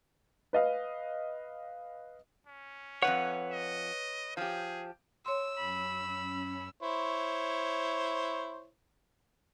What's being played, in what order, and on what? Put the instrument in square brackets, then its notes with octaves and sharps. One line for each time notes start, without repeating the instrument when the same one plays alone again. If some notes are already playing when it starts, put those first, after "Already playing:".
[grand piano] B4 D#5 F5
[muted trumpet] C#4
[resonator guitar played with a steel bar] F2 E3 F#5 [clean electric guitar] B4 C#5
[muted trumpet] D#5
[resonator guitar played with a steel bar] F3 G4 [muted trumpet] G#4
[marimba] C#5 C6 [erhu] E6
[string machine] F#2 C#4 [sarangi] B5
[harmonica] E4 C5 C#5